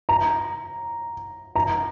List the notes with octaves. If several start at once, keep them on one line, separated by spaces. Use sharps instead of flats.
A#5
A#5